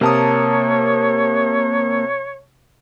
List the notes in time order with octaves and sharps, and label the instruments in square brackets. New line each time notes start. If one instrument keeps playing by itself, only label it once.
[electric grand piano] C3 A5 D#6 [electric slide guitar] A#3 A#4 [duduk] C#5